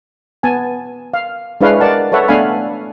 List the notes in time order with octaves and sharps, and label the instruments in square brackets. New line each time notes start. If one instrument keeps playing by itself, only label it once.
[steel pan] B3 G#5 A5
F5
G#3 D4 E4 B4 C#5 F5
A#4 D5 F#5 A5
A4 B4 C#5 E5 F#5
A3 B3 D4 F5 G#5 B5